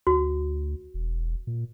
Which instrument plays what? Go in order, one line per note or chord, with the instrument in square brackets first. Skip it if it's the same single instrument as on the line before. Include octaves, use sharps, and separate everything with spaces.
[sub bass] D2 [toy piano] F#4
[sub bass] E1
A#2